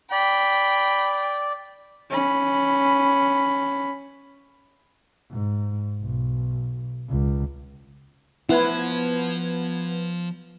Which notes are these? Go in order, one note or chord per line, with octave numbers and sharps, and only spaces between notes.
D5 G5 B5
C#4 B5
G#2
B1
C#2
F3 B3 E4 B4 C5 G#6